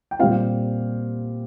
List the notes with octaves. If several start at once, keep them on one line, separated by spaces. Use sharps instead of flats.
G5
A#2 G3 C4 F4 F5